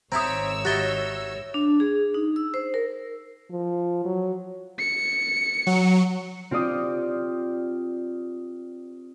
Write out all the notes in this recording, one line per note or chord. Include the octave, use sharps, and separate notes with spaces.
G#1 C4 E4 G4 C#5 A#5 D#6 E6
D#4 E4 F#4 G4 A6 G7
D4
G#4
D#4
E6
C5
A#4
F3
F#3
C#7
F#3
C4 F4 G4 D5 D#6